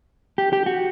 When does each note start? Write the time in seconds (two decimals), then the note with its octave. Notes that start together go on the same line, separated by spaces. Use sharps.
0.38 G4
0.53 G4
0.66 F#4